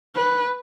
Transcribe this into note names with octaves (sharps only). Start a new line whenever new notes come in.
B4